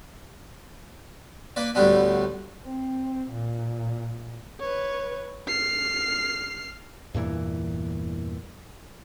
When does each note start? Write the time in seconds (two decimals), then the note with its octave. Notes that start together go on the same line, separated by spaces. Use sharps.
1.56 A#3 B4 D5
1.75 D2 A2 G3 B3 D4
2.65 C4
3.31 A#2
4.60 B4 C#5
5.48 F6 C7
7.14 E2 G2 A#2 E3